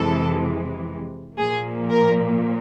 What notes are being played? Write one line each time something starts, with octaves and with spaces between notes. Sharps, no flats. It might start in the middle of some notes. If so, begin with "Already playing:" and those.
Already playing: F2 C3 E3 G#3 A4
A#2 F3 A#3 G#4
A#4